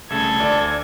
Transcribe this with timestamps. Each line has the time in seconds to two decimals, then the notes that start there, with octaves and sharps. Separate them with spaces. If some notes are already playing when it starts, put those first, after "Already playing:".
0.10 C2 C#3 A3 A4 G#6
0.40 D2 D5